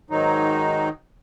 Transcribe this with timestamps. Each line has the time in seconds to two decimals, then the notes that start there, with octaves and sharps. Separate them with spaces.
0.10 G#2 D#3 F#3 D#4